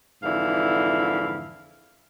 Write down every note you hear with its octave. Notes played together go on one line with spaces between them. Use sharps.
F2 G#2 D3 E3 E4 F5